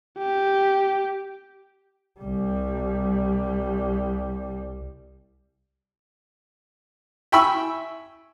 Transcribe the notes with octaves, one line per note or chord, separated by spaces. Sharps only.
G4
C2 G3
E5 G5 G#5 B5 C#6 E6